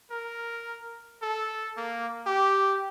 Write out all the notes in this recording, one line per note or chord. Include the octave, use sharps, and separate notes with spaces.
A#4
A4
A#3
G4